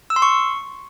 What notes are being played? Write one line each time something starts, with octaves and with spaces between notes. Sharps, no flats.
E6
C6
C#6